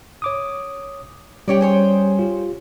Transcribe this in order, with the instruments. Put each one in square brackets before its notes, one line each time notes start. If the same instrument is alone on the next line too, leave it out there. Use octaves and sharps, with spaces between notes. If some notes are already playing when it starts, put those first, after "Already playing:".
[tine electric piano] C#5 D6 D#6
[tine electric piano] G3 C#4 [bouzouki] G4 C#5 D5
[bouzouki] G#4 C5 C#5
[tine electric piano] F4 G4